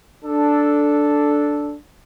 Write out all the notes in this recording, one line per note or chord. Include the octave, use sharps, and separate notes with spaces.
D4 A4